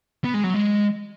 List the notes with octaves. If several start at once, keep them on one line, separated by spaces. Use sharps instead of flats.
B3
G#3
F#3
G#3